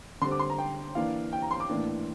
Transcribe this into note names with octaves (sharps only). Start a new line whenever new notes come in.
D3 G3 C4 C6
D6
C6
A#5
G5
E3 A#3 D4 F5
G5
A#5
C6
D6
A2 E3 A#3 D4